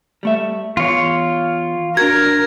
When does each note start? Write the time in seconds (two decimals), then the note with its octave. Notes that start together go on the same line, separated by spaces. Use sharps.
0.23 G3 A3 E5
0.77 E2 F4 C#5
1.97 D4 F#4 A#4 G#6